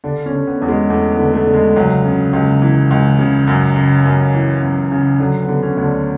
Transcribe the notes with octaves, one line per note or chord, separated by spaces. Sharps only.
D3 D4
C#4
D3
B3
E2
G#3
E2 A3
B3
D3
A3
D3
G#3
C#2 F#3
C#3
C#2
E3
C#2
C#3
F#2
C#3
F#2
E3
F#2
C#3
D3 F#3
B3
D3
C#4
D2
D4